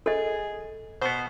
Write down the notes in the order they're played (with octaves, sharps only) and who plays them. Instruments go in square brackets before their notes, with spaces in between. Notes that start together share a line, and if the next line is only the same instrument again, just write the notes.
[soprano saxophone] G#4 [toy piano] A4 D#5
[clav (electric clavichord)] B2 B3 [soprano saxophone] C5